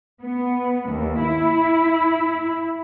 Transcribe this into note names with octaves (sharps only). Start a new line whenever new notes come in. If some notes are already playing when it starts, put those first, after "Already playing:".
B3
D#2
E4